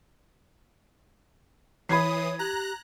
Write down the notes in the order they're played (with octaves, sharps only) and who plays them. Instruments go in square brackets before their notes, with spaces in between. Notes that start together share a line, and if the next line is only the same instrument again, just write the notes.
[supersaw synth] E3 D#6 [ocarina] C#5 [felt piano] B5 G#6 C7
[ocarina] G4 [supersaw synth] A#5 F#6